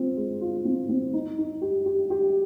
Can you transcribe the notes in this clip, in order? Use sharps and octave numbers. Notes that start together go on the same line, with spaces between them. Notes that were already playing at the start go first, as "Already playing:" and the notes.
Already playing: C4 F4
G#3
F4
C4
C4
D#4
D#4
G4
G4
G4